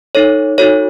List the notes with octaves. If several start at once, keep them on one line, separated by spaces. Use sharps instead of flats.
D#4 A4 C#5
D#4 F#4 A4 C#5